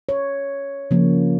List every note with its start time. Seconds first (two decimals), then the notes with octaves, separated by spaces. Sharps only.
0.09 C#5
0.91 C#3 F3 A#3